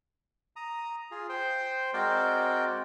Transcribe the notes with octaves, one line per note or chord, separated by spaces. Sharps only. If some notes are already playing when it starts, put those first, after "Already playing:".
A#5 D#6
F4 G#4
C5 G5
G#3 C4 F#4 A#4 D5 G5